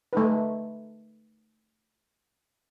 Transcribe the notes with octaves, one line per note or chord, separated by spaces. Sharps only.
A3 D#4 B4